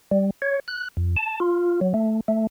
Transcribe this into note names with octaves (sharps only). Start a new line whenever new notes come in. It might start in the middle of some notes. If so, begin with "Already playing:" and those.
G3
C#5
F#6
F2
A5
F4
F#3
A3
A3